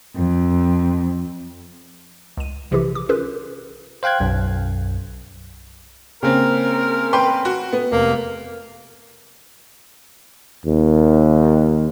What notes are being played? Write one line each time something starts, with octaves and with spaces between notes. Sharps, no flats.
F2
C#2 D#7
B1 C3 E3 F3 E4 G4
D6
C#4 F4 G#4 A#4 B4
C5 F5 G5 F#6 G#6
B1 F#2
C#3 A#3 C4 A#4
B4 G5 C6
F#4
B3
F1 A#3
D#2